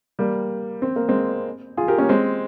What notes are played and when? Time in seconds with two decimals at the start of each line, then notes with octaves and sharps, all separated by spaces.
0.19 G3 A#3
0.82 C4
0.96 A#3
1.08 G#3 C4
1.77 F4 G#4
1.88 G4 A#4
1.98 A#3 C#4
2.09 G#3 C4